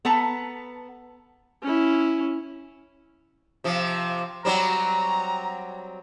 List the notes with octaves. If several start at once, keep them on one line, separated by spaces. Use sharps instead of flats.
B3 A4 B4 A5 A#5
C#4 E4
C3 F3
F#3 G3 C4 A#5